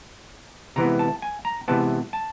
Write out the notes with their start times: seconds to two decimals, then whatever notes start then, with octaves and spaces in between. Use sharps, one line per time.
0.76 C3 E3 G#3 B3 A#5
0.99 A5
1.22 G#5
1.45 A#5
1.68 C3 E3 G#3 B3 A5
2.13 A5